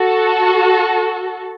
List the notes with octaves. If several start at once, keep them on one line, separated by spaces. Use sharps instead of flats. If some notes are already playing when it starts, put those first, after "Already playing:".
Already playing: F#4 A4